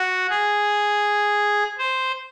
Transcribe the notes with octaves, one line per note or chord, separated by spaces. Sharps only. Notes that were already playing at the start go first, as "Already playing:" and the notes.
Already playing: F#4
G#4
C5